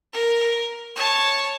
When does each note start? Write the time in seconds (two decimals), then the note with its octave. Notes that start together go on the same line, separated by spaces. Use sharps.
0.13 A#4
0.96 C#5 A5